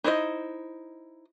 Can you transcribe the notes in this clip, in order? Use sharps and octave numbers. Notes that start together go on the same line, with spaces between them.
D#4 E4 C5 C#5 D#5